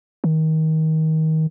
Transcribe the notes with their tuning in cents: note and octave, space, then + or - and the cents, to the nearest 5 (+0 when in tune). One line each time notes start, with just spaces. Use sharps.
D#3 +25